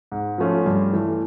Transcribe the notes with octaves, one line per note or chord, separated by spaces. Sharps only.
G#2
F3 A3 C#4 F4
G2
E3 A3